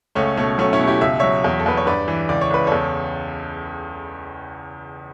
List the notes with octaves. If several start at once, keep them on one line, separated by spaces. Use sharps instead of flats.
C#2 A3 C#4
B2 A3 C#4
F#3 A3 C#4
C#4 E4
B2
E4 G4
C#2 E5
F#3 C#5 E5
E2
A4
E2 B4
C#5
G2 B4 D5
E3
C#2 D5
C#5
C#2 B4
E2 A4 C#5